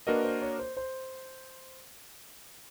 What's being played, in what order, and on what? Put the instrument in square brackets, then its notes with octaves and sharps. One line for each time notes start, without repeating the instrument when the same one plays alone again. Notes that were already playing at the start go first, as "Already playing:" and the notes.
[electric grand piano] A#3 D4 F#4 A#4 D#5 [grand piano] B4
[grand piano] C5
C#5
C5
C5